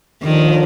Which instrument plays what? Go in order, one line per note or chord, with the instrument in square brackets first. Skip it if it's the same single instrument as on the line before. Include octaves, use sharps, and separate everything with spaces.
[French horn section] D#2 D3 F3 [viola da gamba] D#3